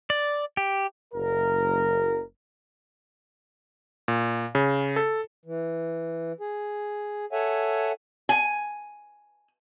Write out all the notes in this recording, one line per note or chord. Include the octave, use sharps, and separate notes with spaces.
D5
G4
F#1 A#4
A#2
C#3
A4
E3
G#4
A4 C#5 E5 F#5 G#5
G#5